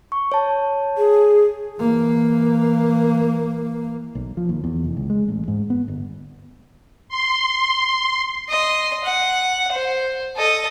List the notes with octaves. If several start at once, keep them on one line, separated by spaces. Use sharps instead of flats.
C#6
C#5 A5
G#4
E3 A#3
B1
F3
D#2
E2
F1
C#2
G#3
A1
G#2
B3
G1
C6
D#5 C6
F#5
C5
A4 D#5